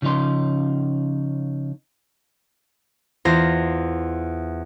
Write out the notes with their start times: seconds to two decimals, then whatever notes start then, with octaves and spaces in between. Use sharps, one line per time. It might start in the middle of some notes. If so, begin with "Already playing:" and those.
0.02 C#3 F3 C#4 D#4 C6
3.25 E2 F4 C5 A#6